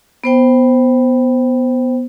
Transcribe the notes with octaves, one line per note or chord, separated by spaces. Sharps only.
B3 C5 G5